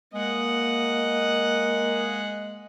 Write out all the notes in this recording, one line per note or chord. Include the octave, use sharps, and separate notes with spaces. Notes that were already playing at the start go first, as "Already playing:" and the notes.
G#3 A#3 D#5 F#5